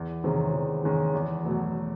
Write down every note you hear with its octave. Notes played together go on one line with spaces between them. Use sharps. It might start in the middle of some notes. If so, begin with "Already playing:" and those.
Already playing: E2
C3 D#3 G#3 C#4
E2
C3 D#3 G#3 C#4
E2
B2 F#3 A3